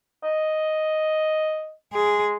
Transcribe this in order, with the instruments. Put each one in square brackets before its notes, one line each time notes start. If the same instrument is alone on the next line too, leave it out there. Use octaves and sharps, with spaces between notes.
[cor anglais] D#5
[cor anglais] G#3 [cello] G#4